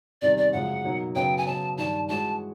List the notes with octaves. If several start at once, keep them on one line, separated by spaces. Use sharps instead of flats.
E2 C3 D#3 G3 D5
D5
F#2 C#3 F3 G#3 F#5
B2 F#3 A#3 D#4
F#2 C#3 F#3 B3 G5
G#5
C#3 F#3 B3 A5
G2 D#3 G3 A5
E3 G#3 C#4 F#4 A5